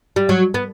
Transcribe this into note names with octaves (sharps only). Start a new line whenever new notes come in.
G3
F#3
B3